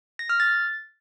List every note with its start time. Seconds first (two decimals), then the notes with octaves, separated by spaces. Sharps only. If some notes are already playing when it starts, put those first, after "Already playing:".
0.19 A#6
0.29 F6
0.40 A6